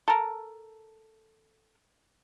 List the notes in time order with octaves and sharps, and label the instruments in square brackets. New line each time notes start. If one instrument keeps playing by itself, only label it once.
[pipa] A4 A#4